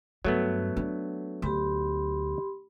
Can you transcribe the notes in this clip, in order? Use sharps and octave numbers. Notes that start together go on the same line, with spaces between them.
G2 F#3 A3 B3
D4
D2 G4 B5 C6